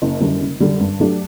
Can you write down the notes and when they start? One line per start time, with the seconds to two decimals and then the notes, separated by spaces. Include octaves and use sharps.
0.02 F#1
0.21 F#2 D3 G3
0.41 F#1
0.60 F#2 D3 G3
0.80 G2
1.00 F#3 A3 D4 G4